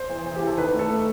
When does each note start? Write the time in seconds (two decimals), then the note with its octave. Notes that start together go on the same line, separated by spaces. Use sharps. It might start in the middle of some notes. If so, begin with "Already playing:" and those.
Already playing: C5
0.10 E2
0.26 E2
0.36 G4
0.41 E2
0.47 A4
0.57 D#3 B4
0.74 A3
0.79 A4
0.90 A3